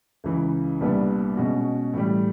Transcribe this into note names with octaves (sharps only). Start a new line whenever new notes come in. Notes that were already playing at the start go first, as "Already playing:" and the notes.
C#2 C#3 E3
C2 A#2 G3 B3 D4
B2 G#3 C#4 F#4
A2 E3 G3